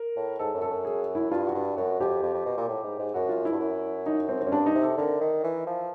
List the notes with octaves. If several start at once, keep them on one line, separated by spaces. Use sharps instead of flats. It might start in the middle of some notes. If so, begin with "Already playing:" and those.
Already playing: A#4
A2
G#2 A4
F#2
A4
F#2
G#4
E4
G2 F4
F#4
G2
F#2 F#4
F2 G4
F2
F2
B2
A#2
A2
G#2
G#2
F#2 F#4
F4
E4
G2
F#2
D#4
C4
C4
C#4
G2 D4
D#4
C3
A4
D3 A#4
D#3
E3
F3